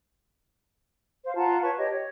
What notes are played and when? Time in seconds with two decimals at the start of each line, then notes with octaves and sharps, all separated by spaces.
1.24 C5 F5
1.36 F4 F#5 A5 A#5
1.63 B4 C#5 A5 C#6
1.77 G4 C#5 D#5
1.89 C#5